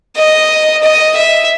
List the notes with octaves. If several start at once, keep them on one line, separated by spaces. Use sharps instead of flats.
D#5
D#5
E5